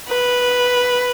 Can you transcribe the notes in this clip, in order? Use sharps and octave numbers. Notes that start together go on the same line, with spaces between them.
B4